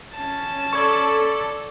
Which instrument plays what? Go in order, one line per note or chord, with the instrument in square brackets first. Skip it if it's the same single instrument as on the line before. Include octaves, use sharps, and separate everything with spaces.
[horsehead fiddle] C#4 A5
[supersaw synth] A4 [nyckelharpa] D5 B5 [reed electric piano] C#6 G#6